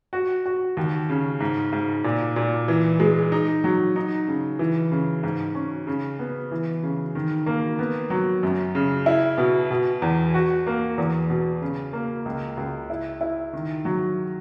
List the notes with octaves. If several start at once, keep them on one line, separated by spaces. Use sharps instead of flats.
F#4
F#4
D#2
C#3
G#2
G#2
A#2
A#2
E3
G#3
D#4
F#3
D#4
C#3
E3
C#3
G#2
C#4
C#3
B3
E3
C#3
D#3
A#3
B3
F#3
F#2
C#3
E4
B2
B2
E2
F#4
A#3
E2
B2
C#3
A#3
C#2
C#2
E4
E4
D#3
F#3